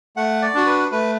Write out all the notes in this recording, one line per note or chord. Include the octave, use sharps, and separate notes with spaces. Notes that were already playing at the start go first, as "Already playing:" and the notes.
A3 F#5
D5
D4 F#4
B4
A3 B4